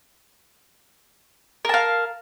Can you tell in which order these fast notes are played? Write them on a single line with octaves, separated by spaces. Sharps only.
A#4 A5 F5